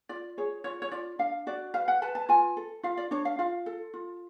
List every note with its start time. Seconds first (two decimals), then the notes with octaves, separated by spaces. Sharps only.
0.09 F4 D5
0.37 G#4 C#5
0.64 F4 C#5
0.82 C#5
0.92 F4 D5
1.19 D4 F5
1.47 F#4 D5
1.74 B4 F5
1.88 F#5
2.02 B4 A5
2.15 A5
2.29 F4 G#5
2.57 A4
2.83 F4 F5
2.97 D5
3.11 D4 C#5
3.25 F5
3.39 F4 F5
3.66 A4
3.94 F4